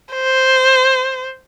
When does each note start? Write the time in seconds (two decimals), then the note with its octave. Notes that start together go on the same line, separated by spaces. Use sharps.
0.15 C5